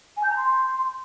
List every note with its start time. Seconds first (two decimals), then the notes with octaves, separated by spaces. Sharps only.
0.16 G#5
0.23 G6
0.29 A#5
0.36 C6